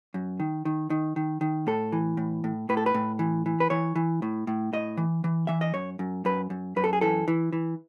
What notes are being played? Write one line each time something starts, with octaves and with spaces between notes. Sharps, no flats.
F#2
D#3
D#3
D#3
D#3
D#3
A2 A4
E3
A2
A2
A2 B4
A4
B4
A2
E3
E3
B4
E3 C#5
E3
A2
A2
A2 D#5
E3
E3
E3 E5
D#5
F#2 C#5
F#2
F#2 B4
F#2
F#2 B4
A4
G#4
E3 A4
E3
E3